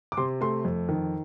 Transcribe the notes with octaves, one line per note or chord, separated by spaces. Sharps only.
D6
C3 C6
A3 C6
F2
D#3